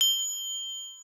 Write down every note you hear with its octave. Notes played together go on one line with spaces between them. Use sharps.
G7